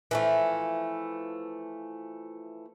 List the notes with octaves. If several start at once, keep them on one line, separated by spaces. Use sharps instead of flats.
E3 F3 A3